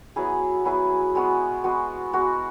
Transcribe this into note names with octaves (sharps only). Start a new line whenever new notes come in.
F#3 B3 E4 G#4
F#3 B3 E4 G#4
G#3 B3 F#4
G#3 B3 F#4
G#3 B3 F#4